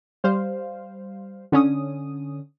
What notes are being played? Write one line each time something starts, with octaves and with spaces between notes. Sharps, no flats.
G3 C5 F5
D3 C#4 D#6